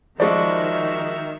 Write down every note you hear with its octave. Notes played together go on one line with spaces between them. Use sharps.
D#3 F3 G#3 F#4 D5 E5 C#6